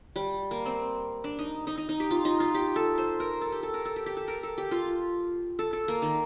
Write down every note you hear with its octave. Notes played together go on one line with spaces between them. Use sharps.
G3
A#3
C4
D4
D#4
D#4
D#4
D#4
G4
F4
D#4
F4
G4
A4
C5
A#4
A4
G4
A4
A#4
A4
G4
G4
A4
A#4
A4
G4
F4
A4
A4
A#3
D#3